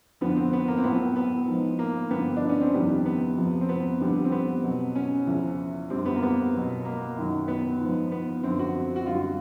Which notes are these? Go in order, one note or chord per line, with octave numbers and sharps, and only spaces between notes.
F2 D3 F3 B3
C4
B3
A#3
C4
A2 F#3 B3
B3
G#2 F3
A#3
G2 D3 F3 B3
D4
C#4
C4
F2 C3 D#3 G3 B3
B3
F2 C3 F3
C4
B3
F2 D3 G3
C4
B3
B2 F#3
C#4
E2 C#3 F3
F#2 D3 G3 C4
B3
A#3
B3
B2 F#3
A#3
F#2 D#3 F#3
B3
G#2 F3
B3
F#2 D3 F3 C4
F#4
F#4
F#2 D3 G3 F4